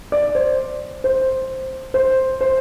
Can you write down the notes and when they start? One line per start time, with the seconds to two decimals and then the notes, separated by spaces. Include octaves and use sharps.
0.12 D5
0.35 C5
1.04 C5
1.94 C5
2.41 C5